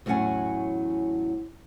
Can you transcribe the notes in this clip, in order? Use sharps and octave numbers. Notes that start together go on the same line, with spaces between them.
E2 A2 F#3 C#4 F#5 G#5